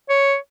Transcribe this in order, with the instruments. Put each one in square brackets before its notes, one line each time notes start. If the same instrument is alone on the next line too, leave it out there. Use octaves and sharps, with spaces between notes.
[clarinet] C#5